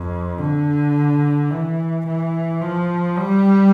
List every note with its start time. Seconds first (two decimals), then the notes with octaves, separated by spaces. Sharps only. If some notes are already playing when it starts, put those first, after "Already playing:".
Already playing: F2
0.38 D3
1.51 E3
2.07 E3
2.61 F3
3.18 G3